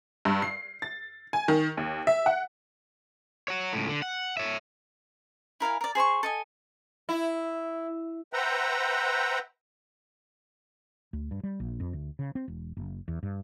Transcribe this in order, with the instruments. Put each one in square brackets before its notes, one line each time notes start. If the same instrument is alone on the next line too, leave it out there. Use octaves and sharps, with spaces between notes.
[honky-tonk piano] G2
C7
A6
G#5
D#3
D#2
E5
F#5
[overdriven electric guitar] C#5 F#5
C#2 A2
D3
F#5
C#5 E5
[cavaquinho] E4 A#4 F5 G#5
A#4 D5
G#4 C5 B5 C#6
A4 D#5 G#5
[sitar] E4
[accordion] B4 C5 E5 F#5 G5 A#5
[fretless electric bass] D2
G2
G3
A#1
F2
D2
C#3
C4
E1
F#1
E2
G2